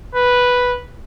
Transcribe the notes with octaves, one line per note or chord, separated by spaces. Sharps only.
B4